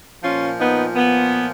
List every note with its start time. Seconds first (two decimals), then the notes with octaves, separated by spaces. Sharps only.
0.23 A#2 F3 C#4 F4
0.59 B3 D#4
0.96 B3